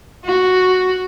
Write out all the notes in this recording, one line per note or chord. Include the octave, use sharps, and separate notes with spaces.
F#4